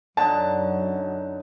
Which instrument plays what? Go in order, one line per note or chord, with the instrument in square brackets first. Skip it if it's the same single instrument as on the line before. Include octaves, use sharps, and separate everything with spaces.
[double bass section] F#2 [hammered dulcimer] D3 F#3 D#4 [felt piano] A5